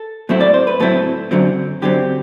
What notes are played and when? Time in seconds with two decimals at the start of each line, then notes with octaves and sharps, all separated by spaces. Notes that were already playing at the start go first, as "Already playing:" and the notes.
Already playing: A4
0.29 A2 F#3 A3 C4 E4
0.40 D5
0.54 C5
0.67 B4
0.80 A2 F#3 A3 C4 E4 A4
1.31 F#2 D3 F#3 C4
1.82 F#2 D3 F#3 C4 G4